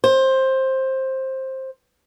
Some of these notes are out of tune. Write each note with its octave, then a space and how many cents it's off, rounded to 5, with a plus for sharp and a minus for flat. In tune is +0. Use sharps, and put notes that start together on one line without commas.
C5 +15